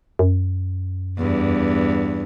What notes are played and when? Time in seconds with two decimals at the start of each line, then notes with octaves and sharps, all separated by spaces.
0.19 F#2
1.19 E2 G2